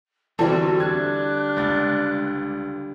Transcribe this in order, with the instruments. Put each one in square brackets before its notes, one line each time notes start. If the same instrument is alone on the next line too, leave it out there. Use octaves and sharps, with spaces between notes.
[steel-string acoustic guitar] D3 G3 [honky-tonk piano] E3 C4 A4 [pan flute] F#4
[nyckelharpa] D4 [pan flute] F#6 [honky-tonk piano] G#6
[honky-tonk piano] C#2 A6